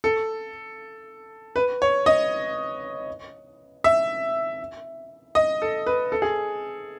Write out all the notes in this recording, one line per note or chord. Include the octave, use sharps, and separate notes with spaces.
A4
B4
C#5
D#5
E5
D#5
A4
B4
A4
G#4